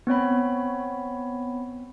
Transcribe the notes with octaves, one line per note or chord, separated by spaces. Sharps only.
B3 C4 C#5 B5